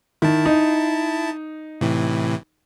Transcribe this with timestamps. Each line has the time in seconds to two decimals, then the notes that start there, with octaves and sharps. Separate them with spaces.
0.22 D#3 E4 A5
0.46 D#4
1.81 A2 C3 E3